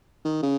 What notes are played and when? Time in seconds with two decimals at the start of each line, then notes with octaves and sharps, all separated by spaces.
0.25 D#3
0.43 C#3